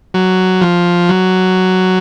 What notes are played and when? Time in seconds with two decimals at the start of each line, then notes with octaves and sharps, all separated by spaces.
0.14 F#3
0.61 F3
1.09 F#3